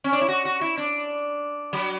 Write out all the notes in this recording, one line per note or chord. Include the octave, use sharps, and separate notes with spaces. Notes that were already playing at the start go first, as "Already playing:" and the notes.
C#4
D4
E4
F#4
F#4
E4
D4
F#3